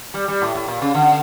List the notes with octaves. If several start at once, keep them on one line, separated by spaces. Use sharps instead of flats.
G3
G3
A2
A2
A#2
C#3
D3